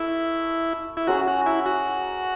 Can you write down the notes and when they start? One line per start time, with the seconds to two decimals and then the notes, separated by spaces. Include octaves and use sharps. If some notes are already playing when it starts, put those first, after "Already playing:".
Already playing: A3 E4
0.97 E4
1.07 F#3 C#4 F#4 G#4 C#5
1.27 F#4
1.46 E4
1.66 F#4